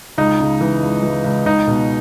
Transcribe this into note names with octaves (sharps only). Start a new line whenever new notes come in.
C#2 D#4
C#3
E3
C#2
E3
C#2
C#2 D#4
B2